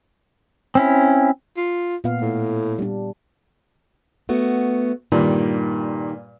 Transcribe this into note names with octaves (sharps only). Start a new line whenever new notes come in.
C4 C#4 E4
F4
A#2 B3 F5
A2
G3 D4
A3 B3 F#4
G2 A#2 D#3 G3